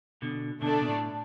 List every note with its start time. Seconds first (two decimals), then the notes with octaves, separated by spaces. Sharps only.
0.22 B2 D3
0.62 B2 D3 A3 D4 A4 D5
0.81 B2
0.88 A2